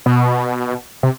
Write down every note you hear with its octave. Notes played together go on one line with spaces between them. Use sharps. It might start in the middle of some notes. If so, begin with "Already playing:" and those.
B2
C3